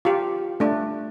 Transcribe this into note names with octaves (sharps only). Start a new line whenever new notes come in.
F4 G4
A3 D4